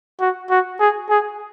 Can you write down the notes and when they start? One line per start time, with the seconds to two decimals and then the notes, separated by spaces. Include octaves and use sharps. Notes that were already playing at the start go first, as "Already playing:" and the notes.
0.20 F#4
0.50 F#4
0.80 G#4
1.10 G#4